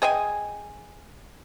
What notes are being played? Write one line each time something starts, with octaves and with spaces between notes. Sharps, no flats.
G#4 D#5 G5 G#5